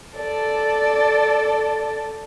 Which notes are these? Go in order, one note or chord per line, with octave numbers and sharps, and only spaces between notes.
A4 D5